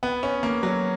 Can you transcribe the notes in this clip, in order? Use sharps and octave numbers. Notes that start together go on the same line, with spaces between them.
B3
C#4
A#3
F#3